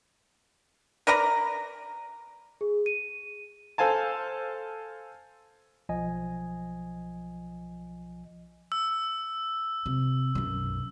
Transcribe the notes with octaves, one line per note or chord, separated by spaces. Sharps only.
A#4 B4 D5 A#5
G#4
D#7
A4 C5 F5 G#5 A5
B1 F3 D#5 G#5
E6
C3
B1 F#2